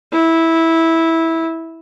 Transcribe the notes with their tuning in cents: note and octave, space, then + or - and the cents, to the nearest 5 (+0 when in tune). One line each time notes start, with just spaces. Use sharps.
E4 -10